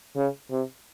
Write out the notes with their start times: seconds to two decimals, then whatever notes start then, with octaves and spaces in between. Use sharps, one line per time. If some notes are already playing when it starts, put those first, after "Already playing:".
0.16 C#3
0.51 C3